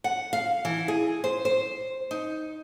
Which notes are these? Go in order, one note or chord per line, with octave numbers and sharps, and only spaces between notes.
F#5
F5
E3
G#4
C5
C5
D#4